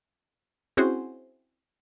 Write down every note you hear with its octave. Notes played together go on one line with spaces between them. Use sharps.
C4 C#4 E4 F#4 G#4 C5